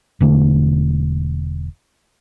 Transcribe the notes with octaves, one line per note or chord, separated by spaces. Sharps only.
E1 D3 A3